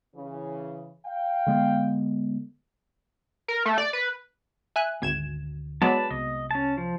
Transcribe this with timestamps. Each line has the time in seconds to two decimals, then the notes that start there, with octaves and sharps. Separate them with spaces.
0.15 C#3 E3
1.06 F5 G5
1.46 D3 G#3 B3
3.48 A#4
3.66 A3
3.78 D5
3.93 B4
4.76 E5 G#5 F#6
5.02 G#1 D2 G#6 E7
5.82 F#3 G#3 B3 B4 D5 A5
6.11 C2 D#5
6.51 C#4 A5
6.77 F3